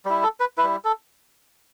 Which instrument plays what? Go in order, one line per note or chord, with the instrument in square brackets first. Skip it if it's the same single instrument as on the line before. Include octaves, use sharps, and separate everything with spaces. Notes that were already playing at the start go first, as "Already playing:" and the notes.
[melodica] G3 E4
A4
B4
E4 B4
G3
A4